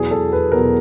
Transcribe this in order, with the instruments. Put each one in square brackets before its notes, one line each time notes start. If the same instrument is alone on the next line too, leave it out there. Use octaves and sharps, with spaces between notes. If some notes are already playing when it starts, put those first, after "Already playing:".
Already playing: [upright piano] E2 B2 F#3 G#4
A4
B4
E2 B2 F#3 A#4